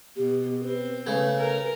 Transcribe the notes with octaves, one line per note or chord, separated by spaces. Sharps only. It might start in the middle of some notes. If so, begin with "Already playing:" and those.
B2 G4
C4 B4
C#3 A3 G#4 B4
A#4